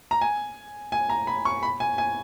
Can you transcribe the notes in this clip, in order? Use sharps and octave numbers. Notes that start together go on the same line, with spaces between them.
A#5
G#5
G#5
A#5
B5
C#6
B5
G#5
G#5